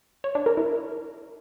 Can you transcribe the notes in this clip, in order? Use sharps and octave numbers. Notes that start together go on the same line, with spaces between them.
C#5
D4
A#4
E4